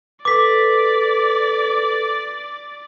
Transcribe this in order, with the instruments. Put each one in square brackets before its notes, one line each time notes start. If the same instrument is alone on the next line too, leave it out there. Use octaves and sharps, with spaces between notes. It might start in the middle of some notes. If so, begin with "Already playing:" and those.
[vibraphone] A4 B4 [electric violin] D5 [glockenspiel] D6 B6